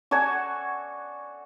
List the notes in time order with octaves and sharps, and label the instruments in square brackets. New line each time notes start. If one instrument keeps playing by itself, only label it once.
[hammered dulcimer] F#4 A4 D5 G#5